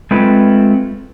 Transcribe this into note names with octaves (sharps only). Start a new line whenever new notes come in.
G#3 A3 C4 F4 B4